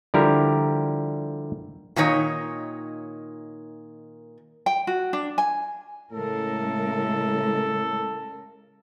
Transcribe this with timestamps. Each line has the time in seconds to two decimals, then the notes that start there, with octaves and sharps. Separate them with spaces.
0.14 D3 F3 G3 E4 G4 A#4
1.96 A#2 D#3 D#4 C#5
4.66 G5
4.87 F#4
5.13 D4
5.38 G#5
6.11 A2 C#3 G#3 A4 A#4